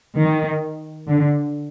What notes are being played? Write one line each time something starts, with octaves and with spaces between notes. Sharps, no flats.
D#3
D3